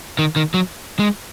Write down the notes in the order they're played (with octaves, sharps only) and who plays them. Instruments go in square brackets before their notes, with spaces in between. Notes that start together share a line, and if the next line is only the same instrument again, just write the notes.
[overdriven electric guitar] D#3
D#3
F#3
G#3